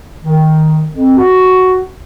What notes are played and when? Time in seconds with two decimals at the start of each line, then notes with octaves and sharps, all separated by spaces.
0.23 D#3
0.92 F2
1.17 F#4